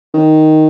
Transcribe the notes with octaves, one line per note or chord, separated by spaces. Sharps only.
D#3